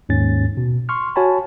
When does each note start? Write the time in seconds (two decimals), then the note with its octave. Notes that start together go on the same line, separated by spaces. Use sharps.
0.09 D#2 G#2 C#4 A6
0.57 B2
0.89 C6 C#6 F6
1.16 F#4 C#5 G#5 A5 B5